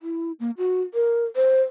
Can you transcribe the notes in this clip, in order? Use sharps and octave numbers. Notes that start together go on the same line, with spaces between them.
E4
A#3
F#4
A#4
C5